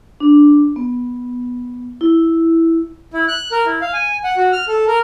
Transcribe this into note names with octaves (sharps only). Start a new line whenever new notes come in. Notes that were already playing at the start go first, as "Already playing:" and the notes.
D4
B3
E4
E4
F#6
A#4
E4
F5
G#5
F#5
F#4
F6
A4
A#4